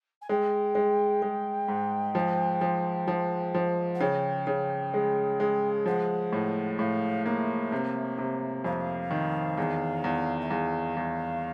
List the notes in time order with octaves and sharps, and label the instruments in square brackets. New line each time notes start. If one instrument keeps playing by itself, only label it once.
[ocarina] G#5
[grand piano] G#3 [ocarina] G5
[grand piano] G#3
G#3
G#2
F3
F3
F3
F3
[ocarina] F#5
[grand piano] C#3 [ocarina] G5
[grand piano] C#3
G#3
G#3
[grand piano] F3 [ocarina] F#5
[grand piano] A2
[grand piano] A2 [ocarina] F5
[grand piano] A#3 [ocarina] E5
[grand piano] C3
C3
[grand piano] F2 [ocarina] F5
[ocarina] E5
F5
[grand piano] D#3
E2
E2
[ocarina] E5
[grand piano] E2 [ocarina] F5
[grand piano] E2